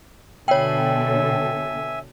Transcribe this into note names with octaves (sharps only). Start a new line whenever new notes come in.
B2 D3 A4 C#5 E5 G5 G#5